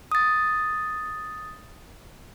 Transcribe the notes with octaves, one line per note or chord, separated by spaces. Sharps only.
D#6 A6